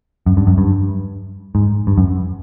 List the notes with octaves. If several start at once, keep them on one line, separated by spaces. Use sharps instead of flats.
F#2
G2
F#2
G2
G#2
G2
F#2